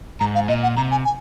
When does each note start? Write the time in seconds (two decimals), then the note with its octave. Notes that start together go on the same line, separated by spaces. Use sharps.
0.20 G#2 A#5
0.35 F5
0.48 A#2 D#5
0.63 F#5
0.76 C3 A#5
0.91 G#5
1.05 G#5